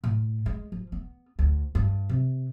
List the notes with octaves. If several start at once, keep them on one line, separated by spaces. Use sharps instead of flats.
A2
G#3
F3
B3
D2
G2
C3